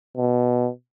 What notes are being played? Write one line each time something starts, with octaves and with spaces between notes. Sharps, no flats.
B2